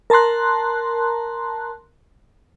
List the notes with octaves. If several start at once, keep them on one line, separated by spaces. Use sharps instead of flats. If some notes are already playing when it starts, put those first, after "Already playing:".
A#4 A5 A#5 C6 F#6